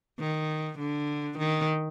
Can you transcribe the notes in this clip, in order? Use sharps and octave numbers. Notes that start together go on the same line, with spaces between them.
D#3
D3
D#3